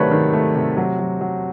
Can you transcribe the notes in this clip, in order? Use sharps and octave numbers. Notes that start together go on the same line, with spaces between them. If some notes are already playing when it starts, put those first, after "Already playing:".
Already playing: C3 D#3 F#3 A3 B4 C#5 D5
D#3
A3
C3
F#3
F#3
F#3